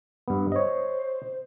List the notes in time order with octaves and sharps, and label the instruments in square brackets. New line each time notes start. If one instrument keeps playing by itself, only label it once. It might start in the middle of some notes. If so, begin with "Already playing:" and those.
[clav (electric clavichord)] G2 B3
[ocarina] C5 [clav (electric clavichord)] C#5 D#5